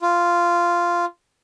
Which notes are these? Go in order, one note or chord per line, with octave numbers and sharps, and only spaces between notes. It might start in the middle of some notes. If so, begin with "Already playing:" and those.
F4